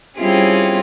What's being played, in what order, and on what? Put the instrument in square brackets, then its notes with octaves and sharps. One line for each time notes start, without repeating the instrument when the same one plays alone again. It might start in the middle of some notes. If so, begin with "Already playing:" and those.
[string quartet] G3 C4 C#4 E4 F4 G#4